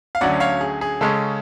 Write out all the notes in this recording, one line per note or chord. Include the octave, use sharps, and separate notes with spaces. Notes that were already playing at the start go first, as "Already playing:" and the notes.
F5
D2 D3 F#3 C#4 D5 F#5
C#5 F5
G#4
G#4
C#3 G#3 C#4 A4